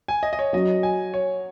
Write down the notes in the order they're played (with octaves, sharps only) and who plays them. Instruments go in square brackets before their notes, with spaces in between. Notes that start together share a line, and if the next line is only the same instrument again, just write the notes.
[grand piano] G#5
D#5
D#5
C#5
[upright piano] F#3 C#4 F#4 [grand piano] D#5
[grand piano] G#5
C#5